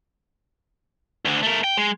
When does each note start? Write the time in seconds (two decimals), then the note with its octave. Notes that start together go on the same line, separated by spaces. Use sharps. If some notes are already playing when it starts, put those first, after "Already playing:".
1.25 D2 D3
1.43 A3 A#4
1.64 G5
1.77 G#3